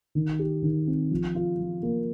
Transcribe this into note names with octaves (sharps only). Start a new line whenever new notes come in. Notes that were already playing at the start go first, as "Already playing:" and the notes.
D#3
G4
D#3
C4
F3
F4
F3
A#3